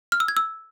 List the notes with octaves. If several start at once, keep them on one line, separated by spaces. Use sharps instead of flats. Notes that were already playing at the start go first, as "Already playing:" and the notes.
F6
E6
G#6
E6